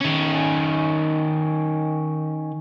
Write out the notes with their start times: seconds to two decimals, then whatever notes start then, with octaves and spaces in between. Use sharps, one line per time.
0.01 D#3 C#4